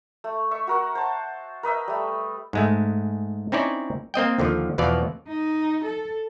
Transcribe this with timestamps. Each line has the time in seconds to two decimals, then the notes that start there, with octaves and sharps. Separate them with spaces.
0.24 A3
0.51 E5 C#6
0.67 F#4 A#4 F#5
0.95 C5 A5
1.63 A#4 B4 D#5 E5
1.88 G3 A3
2.53 G#2 G#3 A3
3.52 C4 C#4 D#4 E4 C#5 D5
4.14 A#3 C4 D#5 G5
4.39 D#2 D3 D#3 F3
4.78 E2 B2 E3 F3 D5 F5
5.29 D#4
5.85 A4